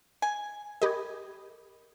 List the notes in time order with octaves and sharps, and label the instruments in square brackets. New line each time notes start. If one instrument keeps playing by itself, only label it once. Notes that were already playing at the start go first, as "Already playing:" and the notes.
[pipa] G#5
[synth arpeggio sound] G4 D#5 [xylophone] A#4 B5 G#6